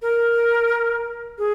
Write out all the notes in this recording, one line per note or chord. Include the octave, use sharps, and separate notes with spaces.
A#4
G#4